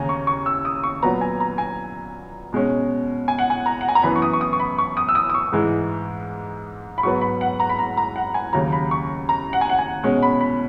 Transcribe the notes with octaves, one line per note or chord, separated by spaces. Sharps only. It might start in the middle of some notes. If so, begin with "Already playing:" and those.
Already playing: D#2 C#3 C#4 G#5 A#5
C#6
C#6
E6
D#6
C#6
A#2 F#3 B3 A#5
G#5
A#5
G#5
B2 G#3 C#4
G#5
F#5
G#5
A#5
F#5
G#5
A#5
F#2 E3 B3 B5
C#6
D#6
C#6
D#6
C#6
B5
C#6
D#6
E6
D#6
D#6
C#6
G#2 E3 G#3
B5
G#2 F#3 B3 C#6
B5
F#5
A#5
B5
A#5
A#5
F#5
G#5
D#2 C#3 F#3 A#5
B5
C#6
A#5
F#5
G#5
F#5
G#5
B2 G#3 C#4
B5
B5